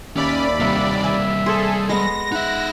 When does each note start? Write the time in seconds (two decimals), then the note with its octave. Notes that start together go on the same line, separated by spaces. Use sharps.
0.16 D#2 C#4 D5 E5 B5
0.60 C3 G3 A#3 E5
1.04 E5 G#5
1.46 G#4 A4 C5
1.89 G#3 B3 A#6
2.32 D#4 E5 F#5